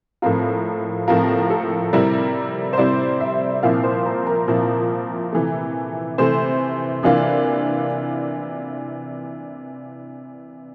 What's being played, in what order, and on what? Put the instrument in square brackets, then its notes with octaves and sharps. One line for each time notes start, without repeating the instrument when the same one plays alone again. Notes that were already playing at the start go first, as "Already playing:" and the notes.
[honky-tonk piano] A2 F3 C4 F4 A#4
A2 F3 C4 F4 A#4
A4
C3 G3 C4 E4 A#4
C5
C3 G3 C4 E4 D5
E5
A#2 F3 C4 E4 F5
C5
A#4
A#4
A#2 F3 C4 E4
C3 E3 A3
C3 E3 A3 C5
C3 E3 A#3 D4 F4